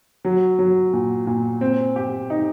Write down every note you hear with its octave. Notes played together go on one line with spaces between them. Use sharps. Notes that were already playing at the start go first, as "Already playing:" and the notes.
F#3
F#3
A#2
A#2
C4
G4
D#4